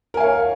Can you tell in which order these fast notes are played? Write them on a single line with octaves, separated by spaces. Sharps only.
A#4 G#5 F5 C#5